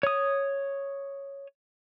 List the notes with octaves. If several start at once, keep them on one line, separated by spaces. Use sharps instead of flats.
C#5 D#6